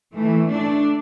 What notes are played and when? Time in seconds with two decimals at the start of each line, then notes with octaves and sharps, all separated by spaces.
0.15 E3 A3
0.51 A3 D4